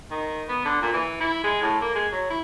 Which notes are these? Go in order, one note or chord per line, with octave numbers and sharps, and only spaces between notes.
D#3
B3
D3
A#2
E3
E4
G#3
A2
A#3
G#3
F#3
E4